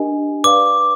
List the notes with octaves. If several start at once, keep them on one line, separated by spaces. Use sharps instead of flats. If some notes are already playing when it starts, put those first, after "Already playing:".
Already playing: D4 G4 A#4 D#5 G#5
B4 D5 F5 D6